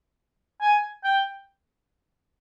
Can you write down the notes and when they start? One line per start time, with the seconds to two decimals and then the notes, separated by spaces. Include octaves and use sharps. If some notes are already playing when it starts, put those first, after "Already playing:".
0.62 G#5
1.04 G5